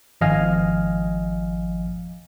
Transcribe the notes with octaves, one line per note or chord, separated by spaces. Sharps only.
G#1 F3 D#5 F5 G#5 F6